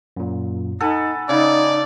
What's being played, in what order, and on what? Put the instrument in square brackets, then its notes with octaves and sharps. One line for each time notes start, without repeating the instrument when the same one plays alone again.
[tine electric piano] F#2 A#2
[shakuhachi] D#4 [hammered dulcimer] A4 [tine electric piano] F#5 G#5 B5
[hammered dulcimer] C#3 [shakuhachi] D#4 [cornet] D5